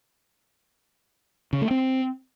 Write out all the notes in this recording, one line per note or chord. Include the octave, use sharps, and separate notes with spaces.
C#3
A3
C4